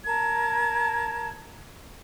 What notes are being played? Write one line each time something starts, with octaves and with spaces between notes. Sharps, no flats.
A#4 A5 G#6